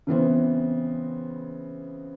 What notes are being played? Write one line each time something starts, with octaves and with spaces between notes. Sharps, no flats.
C#3 E3 B3 C4